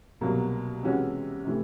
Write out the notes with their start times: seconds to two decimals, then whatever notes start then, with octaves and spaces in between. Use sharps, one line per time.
0.21 C2 B2 F#3 A#3
0.83 C3 E3 G#3 C#4 F#4
1.45 C3 E3 A3